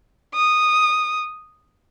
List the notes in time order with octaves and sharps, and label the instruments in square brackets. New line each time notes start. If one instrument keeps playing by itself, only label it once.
[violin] D#6